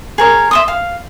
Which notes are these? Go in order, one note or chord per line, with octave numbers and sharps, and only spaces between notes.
G#4 A#4 C#5
E5 C6 D#6
F5